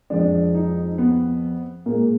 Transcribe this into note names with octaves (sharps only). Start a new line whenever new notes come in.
F2 F3 G#3 D4
D#4
B3
A#2 G#3 A#3